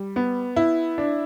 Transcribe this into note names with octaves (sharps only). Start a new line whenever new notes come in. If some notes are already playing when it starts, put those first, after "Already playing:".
Already playing: G3
B3
E4
D4